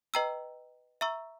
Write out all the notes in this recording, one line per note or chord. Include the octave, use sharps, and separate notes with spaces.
B4 D#5 G5 A#5 E6
E5 A#5 C#6 E6